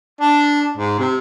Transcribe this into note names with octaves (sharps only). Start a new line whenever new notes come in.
D4
G#2
C3